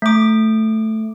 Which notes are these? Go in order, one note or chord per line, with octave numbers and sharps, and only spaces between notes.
A3 D6